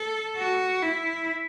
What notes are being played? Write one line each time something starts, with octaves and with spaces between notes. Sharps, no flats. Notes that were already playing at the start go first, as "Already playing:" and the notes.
Already playing: A4
F#4
E4